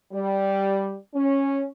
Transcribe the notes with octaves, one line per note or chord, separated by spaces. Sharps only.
G3
C#4